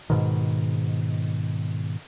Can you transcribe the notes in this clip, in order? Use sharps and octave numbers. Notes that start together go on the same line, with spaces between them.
G#2 B2 D#3